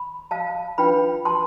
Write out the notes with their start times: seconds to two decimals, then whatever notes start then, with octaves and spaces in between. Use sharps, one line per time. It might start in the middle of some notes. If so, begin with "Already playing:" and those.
Already playing: B5
0.31 F5 A5
0.78 D4 F4 B4 G5 B5
1.25 A5 C6